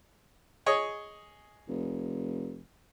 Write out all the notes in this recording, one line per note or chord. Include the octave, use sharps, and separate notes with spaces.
G#4 C#5 D#5
F1